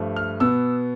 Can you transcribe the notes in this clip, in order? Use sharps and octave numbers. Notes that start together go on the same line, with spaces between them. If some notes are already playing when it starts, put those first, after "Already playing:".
Already playing: G2 F3 A3
F6
B2 B3 E6